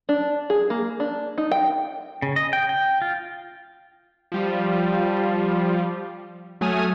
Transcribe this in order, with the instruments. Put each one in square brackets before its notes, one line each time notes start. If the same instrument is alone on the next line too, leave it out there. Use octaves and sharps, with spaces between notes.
[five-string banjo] D4
G#4
A#3
D4
D#4
G5
[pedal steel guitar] C#3
D#5
G5
G5
F4
[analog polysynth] F3 G3 F4
F#3 A3 G#5 D#6 F6 D#7